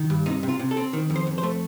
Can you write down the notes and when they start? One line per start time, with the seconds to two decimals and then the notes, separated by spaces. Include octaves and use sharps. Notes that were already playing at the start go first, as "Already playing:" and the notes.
Already playing: D#3
0.10 G2
0.26 C3 D#4
0.43 C3
0.49 F4
0.59 C3
0.71 A4
0.77 C4
0.93 D#3
1.10 F2
1.16 C5
1.27 F2
1.38 C5
1.43 A3